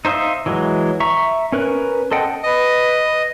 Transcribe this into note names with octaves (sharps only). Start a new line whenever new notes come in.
D#4 C5 E5 F5 D#6
E3 F#3 G#3
E5 A#5 C#6
C#4 A#4 B4 F#6
A4 C5 D#5 F#5 G5
B4 D#5